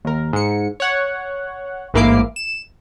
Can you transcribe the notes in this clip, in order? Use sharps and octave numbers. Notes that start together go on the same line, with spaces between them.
D#2 A#4
G#2 C#7
C#5 F#5
A1 G#2 A#3 E4 D6 C7
E7